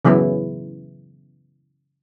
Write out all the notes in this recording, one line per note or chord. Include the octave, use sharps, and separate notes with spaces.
C#3 E3 F#3 B3 E4